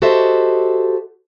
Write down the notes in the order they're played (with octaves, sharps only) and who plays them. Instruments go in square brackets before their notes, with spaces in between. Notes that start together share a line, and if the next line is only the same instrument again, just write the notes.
[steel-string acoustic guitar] F#4 G4 A4 C5 D#5 E5